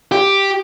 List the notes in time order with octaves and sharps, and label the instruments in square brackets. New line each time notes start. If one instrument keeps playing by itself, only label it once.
[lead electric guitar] G4